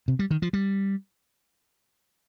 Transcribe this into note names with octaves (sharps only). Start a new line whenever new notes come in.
C3
G3
D#3
F3
G3